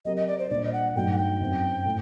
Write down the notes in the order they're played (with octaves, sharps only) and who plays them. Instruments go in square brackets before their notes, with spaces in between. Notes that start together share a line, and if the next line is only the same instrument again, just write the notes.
[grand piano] F#3 C4 G4 A#4 [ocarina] D#5
[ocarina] D#5
D5
C5
[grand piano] A#2 G3 D4 [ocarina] D5
[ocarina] D#5
F#5
[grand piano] G2 F#3 A3 D#4 F#4 [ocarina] G5
[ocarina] F#5
G5
[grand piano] F#2 F#3 C4
A2 A3